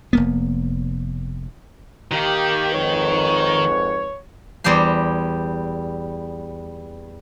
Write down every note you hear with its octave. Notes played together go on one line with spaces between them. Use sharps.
F1 A#3 B3
D#3 A#3 G4
F2 G#2 B4 C#5
E2 G3 G4 C5 C6